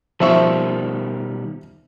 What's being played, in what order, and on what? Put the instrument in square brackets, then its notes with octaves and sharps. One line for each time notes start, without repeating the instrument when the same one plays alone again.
[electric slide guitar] B2 D#3 G3 [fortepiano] F3 E5 C#6